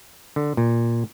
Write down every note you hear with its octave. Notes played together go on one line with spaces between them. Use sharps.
D3
A#2